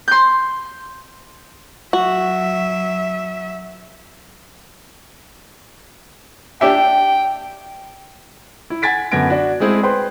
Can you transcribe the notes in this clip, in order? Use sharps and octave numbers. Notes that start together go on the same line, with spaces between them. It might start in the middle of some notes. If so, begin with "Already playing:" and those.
C6 G6
F#3 F#4 E5
D4 G4 E5 G5
E4
F#5 G#5 G#6 A6 B6 D7
F#2 D3 B3 G#6 A#6 D7
D4 F#4
G#3 A3 C4 E4 G#4
B4 C5 G5 C6